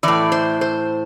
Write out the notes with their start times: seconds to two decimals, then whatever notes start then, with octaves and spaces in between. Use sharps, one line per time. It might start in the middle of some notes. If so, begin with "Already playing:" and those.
0.03 A2 E3 D5
0.32 C5
0.61 C5